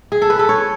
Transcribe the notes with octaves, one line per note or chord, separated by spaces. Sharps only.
G#4
A4
B4
A4
C#5